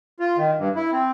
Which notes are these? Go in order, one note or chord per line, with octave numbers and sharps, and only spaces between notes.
F4
D#3
G2
E4
C4